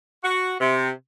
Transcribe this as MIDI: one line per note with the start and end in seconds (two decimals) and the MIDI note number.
0.24 0.54 66
0.60 0.89 48